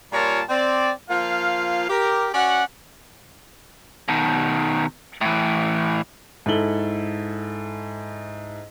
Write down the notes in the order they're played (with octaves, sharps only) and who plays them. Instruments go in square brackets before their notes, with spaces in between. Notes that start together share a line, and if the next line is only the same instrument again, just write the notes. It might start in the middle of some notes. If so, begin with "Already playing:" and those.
[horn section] A#2 G3 F4 A#4 C#5 A5
C4 D5
F3 A#3 F4 F5
G4 A#4
C#4 F#4 D5 F#5
[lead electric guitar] B2 D#3
A2 E3
[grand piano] G#2 E4 A4 F#7 G7